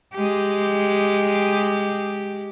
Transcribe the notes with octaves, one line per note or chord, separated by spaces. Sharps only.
G#3 G4